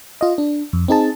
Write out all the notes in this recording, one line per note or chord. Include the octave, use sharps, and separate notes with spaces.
F4 D#5
D4
F2
C4 D#4 G#4 A5